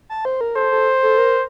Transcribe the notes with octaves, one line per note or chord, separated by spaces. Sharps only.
A5
C5
A#4
A4 C5
A4
A4
A#4